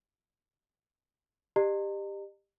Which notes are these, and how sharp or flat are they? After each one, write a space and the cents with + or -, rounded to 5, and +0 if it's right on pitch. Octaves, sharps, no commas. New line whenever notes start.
G4 +15 D#5 -45 A#5 -35